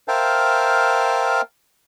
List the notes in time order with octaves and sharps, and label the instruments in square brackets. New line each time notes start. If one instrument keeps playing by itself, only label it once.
[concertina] A#4 C5 E5 F5 G5 A5